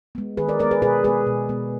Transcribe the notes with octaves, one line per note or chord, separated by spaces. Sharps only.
G#3 B3
D#3 G#4 B4
A#4 D5
G#3 B3 A#4 D5
G#4 B4
B2 G#4 B4
G#3 B3 G#4 B4
B2
G#3 B3